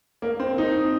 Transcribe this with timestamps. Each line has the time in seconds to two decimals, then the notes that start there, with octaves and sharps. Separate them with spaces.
0.22 A#3
0.40 C4
0.58 D#4